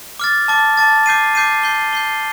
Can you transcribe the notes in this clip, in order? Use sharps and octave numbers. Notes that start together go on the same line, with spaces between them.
D6 F6 A6
A5 D6 A6
A5 D6 A6
D6 G6 C7 D#7
D6 G6 C7 D#7
G6 C7 G7
G6 C7 G7